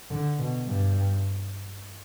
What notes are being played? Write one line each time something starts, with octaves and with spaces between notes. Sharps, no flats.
D3
B2
G2